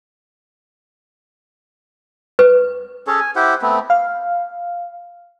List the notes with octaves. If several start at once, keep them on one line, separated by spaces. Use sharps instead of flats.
B4
C#4 G#4 A4 C#5
G#5
E4 G4 C5 F#5
A3 B3 C4
F5